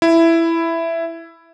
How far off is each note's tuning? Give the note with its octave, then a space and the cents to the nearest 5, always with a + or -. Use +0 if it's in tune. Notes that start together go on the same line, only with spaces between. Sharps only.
E4 +10